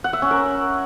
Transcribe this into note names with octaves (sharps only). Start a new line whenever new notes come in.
F#5
E5
C#4
A#4